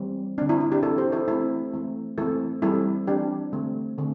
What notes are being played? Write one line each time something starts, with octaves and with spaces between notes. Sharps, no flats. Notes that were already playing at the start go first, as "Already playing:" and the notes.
Already playing: E3 G3 C4
D3 C4 D4
E4
E4
D4 G4
E3 C4 E4 A4
G4 C5
E4 A4
E3 A3 C4 E4 A4
E3 A3 C4
E3 A3 C4 E4 A4
E3 G3 C4 E4 A4
E3 C4 D4 G4
D3 A3 C4
D3 A3 C4